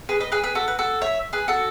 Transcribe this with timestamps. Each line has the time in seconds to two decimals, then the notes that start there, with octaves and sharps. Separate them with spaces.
0.09 G#4 B4
0.20 B4 D#5
0.32 G#4 B4
0.43 G#4 B4
0.55 F#4 A4
0.68 B4
0.79 F#4 A4
1.02 C#5 E5
1.33 G#4 B4
1.48 F#4 A4